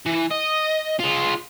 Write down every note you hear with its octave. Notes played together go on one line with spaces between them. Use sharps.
E3
D#5
G#3 F4